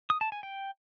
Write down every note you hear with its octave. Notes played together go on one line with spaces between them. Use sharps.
D#6
A5
G#5
G5